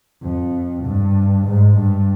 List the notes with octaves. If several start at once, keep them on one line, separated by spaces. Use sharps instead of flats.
F2
G2
G#2
G2